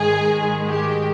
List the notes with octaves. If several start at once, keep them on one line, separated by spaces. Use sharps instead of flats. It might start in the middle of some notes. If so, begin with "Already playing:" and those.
Already playing: G#2 D#3 G#3 G#4
G4